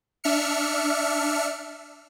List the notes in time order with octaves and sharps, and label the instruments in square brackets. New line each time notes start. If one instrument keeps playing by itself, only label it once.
[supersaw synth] D4 E5 F6 C#7